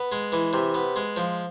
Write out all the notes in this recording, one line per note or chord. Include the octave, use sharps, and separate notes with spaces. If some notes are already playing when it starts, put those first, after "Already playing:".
Already playing: B3
G#3
E3
C3
B3
G#3
F3